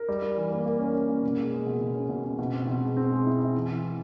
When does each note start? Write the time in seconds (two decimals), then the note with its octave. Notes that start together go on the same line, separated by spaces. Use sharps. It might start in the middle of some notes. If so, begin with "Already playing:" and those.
Already playing: A#4
0.09 G3
0.22 G3
0.37 E3
0.52 A#3
0.66 A#3
0.79 C#4
0.95 C#4
1.09 A#3
1.23 B2
1.37 G#3
1.53 G#3
1.67 B2
1.81 B2
1.95 C#4
2.09 B2
2.24 B2
2.39 B2
2.53 C4
2.67 B2
2.82 G#3
2.97 C4
3.11 G#3
3.26 E4
3.40 E4
3.55 E3
3.68 E3
3.84 E3